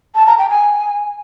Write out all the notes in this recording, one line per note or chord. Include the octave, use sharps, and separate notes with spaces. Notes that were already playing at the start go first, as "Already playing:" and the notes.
A5
A#5
G5
G#5